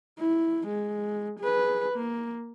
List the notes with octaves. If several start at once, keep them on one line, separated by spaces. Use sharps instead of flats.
E4
G#3
G#4 B4
A#3